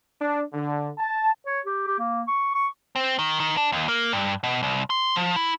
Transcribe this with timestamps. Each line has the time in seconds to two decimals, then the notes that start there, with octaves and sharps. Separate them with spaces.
0.20 D4
0.53 D3
0.98 A5
1.46 C#5
1.66 G4
1.87 G4
1.99 A#3
2.28 C#6
2.54 C#6
2.96 C4
3.19 D#3
3.40 D#3
3.57 D4
3.72 D#2
3.89 A#3
4.13 G2
4.43 B2
4.63 C2
4.90 C6
5.16 F3
5.36 E4